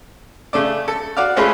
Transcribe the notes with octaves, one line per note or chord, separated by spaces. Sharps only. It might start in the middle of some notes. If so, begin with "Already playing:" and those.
C#3 A3 D5
A4
F#4 D5 F5
G#3 A3 C#4 F4 G#4 B4